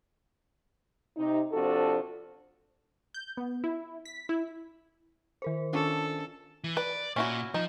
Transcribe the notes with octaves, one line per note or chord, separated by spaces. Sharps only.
C3 D#4
C3 F3 D4 F#4 A4
G6
B3
E4
B6
E4
D#3 A#4 C5
C#4 D4 F4 A4
E3
B4 D5
A#2 C#4 E4 F#4
F3 D#4